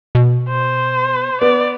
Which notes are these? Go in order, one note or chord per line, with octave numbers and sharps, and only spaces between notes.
B2
C5
B3 D5